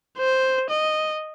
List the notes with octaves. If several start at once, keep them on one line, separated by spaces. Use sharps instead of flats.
C5
D#5